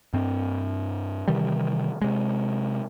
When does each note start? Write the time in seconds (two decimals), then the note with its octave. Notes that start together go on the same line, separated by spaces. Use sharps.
0.14 G2 C4
1.28 C3 D#3 E3 G3
2.02 C3 G#3